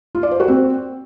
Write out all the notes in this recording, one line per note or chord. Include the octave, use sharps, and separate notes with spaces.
F4
D5
C5
F#4
C4